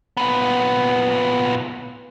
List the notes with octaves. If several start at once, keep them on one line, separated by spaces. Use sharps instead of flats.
A#2 B3